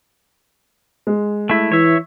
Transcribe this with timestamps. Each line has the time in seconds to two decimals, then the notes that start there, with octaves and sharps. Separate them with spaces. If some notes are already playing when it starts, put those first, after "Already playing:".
1.07 G#3
1.49 A3 E4
1.72 E3 C#5 E5